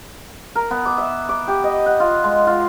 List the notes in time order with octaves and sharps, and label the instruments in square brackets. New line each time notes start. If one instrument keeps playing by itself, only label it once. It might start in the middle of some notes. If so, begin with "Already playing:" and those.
[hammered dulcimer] A#4
B3
D6
E5
D6
G4
D#5
F#5
F4
G#3
F4